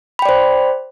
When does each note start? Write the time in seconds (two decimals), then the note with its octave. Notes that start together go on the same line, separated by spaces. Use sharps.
0.19 B5
0.22 G5
0.25 D5
0.29 C5